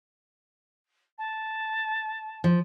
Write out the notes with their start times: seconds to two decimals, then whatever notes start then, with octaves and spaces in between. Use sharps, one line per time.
1.18 A5
2.44 F3